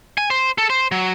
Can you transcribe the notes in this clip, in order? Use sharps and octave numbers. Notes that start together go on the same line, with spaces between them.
G#5
C5
A4
C5
F#3